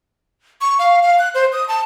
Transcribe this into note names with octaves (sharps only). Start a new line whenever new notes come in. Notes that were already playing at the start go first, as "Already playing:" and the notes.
C#6
F5
F5
F#6
C5
D#6
A5